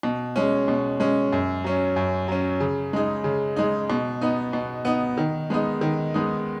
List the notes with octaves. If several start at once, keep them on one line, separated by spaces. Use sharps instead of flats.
B2
G#3 C#4
B2
G#3 C#4
F#2
F#3 C#4
F#2
F#3 C#4
C#3
G#3 D#4
C#3
G#3 D#4
B2
B3 D#4
B2
B3 D#4
D#3
G#3 B3 D#4
D#3
G#3 B3 D#4